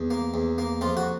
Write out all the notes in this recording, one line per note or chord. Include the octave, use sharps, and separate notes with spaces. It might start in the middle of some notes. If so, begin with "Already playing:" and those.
Already playing: E2
A#3
E2
A#3
F2 F4
F#4